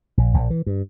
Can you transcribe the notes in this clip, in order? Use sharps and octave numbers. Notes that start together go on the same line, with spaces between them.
A#1
A#1
E3
G2